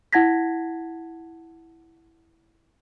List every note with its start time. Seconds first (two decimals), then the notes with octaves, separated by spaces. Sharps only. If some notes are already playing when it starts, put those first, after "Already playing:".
0.13 E4 F#5 A5 G#6 A#6 B6